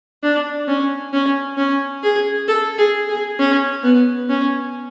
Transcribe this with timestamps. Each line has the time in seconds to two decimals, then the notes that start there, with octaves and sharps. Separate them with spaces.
0.23 D4
0.68 C#4
1.14 C#4
1.58 C#4
2.03 G#4
2.48 A4
2.79 G#4
3.09 G#4
3.39 C#4
3.83 B3
4.29 C#4